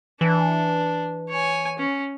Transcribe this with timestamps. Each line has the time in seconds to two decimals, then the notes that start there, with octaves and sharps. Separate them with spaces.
0.21 E3 D4
1.29 C#5 G#5
1.79 C#4